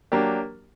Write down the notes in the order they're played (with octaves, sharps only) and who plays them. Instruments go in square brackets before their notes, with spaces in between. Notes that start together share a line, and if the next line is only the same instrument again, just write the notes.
[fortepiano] F#3 A#3 D4 G4